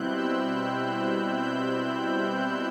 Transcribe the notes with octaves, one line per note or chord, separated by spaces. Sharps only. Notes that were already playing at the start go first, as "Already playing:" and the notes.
Already playing: B2 G3 C4 E4 F#6 G6
E6
G6